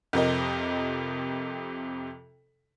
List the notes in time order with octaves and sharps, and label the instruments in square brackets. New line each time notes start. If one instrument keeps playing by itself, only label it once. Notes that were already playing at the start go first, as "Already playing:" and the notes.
[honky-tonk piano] F2 C3 A#4 D#5